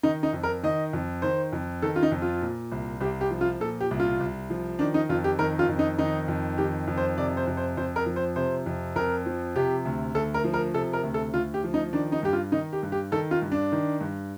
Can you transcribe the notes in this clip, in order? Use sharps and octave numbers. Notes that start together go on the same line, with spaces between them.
D#3 D#4
D#4
F2
A#4
D#3 D#5
F2
D#3 C5
F2
D#3 A4
F4
D#4
F2
F4
A#2
C2
C2 G4
G4
F3
F4
A#2 A4
G4
C2
F4
C2
F3
D#3 D4
D#4
F2 F4
G4
D#3 A#4
F4
F2
D#4
D#3 D#4
F2
D#3 G4
F2
C5
C3 D5
C5
F2
C5
F2 C5
A#4
F3
C5
C3 C5
F2
F2 A#4
F3
C3 G4
D2
D2 A4
A#4
F3
A#4
C3 A4
A#4
D2
A4
D2 F4
G4
F3
D#4
D#3 D4
D#4
G2 G4
F4
D#3 D#4
G4
G2
G4
D#3 A4
F4
G2
D4
D#3
G2